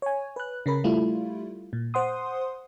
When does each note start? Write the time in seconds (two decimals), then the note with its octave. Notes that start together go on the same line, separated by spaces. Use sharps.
0.02 C#5 G#5
0.36 B4 F#6
0.66 C#3 C#4 A#4 B5
0.84 G3 A3 E4 F4
1.73 A#2
1.94 C5 F#5 C6 D#6